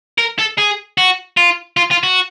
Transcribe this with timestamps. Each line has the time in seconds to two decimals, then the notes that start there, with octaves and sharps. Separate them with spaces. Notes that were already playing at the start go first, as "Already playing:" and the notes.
0.18 A#4
0.39 A4
0.58 G#4
0.98 F#4
1.37 F4
1.77 F4
1.91 F4
2.03 F#4